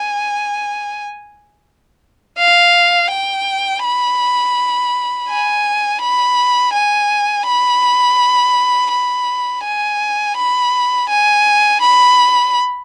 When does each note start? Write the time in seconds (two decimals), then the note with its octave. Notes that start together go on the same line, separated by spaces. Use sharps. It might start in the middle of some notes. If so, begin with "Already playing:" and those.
Already playing: G#5
2.38 F5
3.11 G5
3.84 B5
5.29 G#5
6.01 B5
6.74 G#5
7.47 B5
8.91 B5
9.64 G#5
10.37 B5
11.09 G#5
11.82 B5